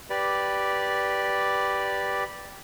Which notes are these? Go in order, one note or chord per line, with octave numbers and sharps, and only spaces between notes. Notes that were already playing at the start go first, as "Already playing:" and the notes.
G4 B4 D5